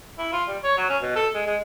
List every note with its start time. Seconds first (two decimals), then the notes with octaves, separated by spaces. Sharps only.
0.18 E4
0.33 F4
0.48 G3
0.63 C#5
0.77 F#3
0.89 C#4
1.02 B2
1.16 A4
1.34 G#3
1.47 G#3